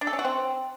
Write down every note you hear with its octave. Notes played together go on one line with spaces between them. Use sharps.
D4
A4
C#4
F#4
C4